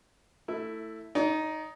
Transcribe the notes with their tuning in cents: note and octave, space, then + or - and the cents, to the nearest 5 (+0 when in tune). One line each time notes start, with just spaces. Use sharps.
A3 +15 E4 +0 E6 +0
D#4 +5 D5 -40